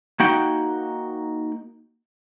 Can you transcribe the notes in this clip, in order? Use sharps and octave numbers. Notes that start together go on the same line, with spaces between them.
A#3 D#4 F#4 F#5 G5